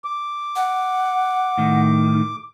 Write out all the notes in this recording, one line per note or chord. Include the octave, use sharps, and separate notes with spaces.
D6
F#5
A2 D#3